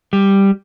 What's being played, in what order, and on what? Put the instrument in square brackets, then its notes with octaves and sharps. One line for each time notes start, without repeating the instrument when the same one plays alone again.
[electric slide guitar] G3